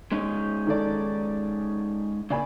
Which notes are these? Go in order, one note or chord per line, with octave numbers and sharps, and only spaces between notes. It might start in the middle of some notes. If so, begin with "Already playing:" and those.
G#3 C#4 D#4
D#3 A4 D5
A#2 C#3 D5 G#5 B5